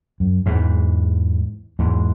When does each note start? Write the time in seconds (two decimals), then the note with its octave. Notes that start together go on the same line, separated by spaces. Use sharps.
0.20 F#2
0.46 E2 G#2
1.79 E2 G#2